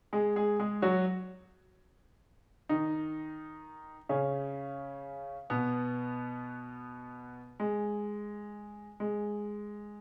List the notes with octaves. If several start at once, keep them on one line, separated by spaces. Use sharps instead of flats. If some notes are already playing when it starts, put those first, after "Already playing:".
G#3 G#4
G#3 G#4
G#3 G#4
F#3 F#4
D#3 D#4
C#3 C#4
B2 B3
G#3
G#3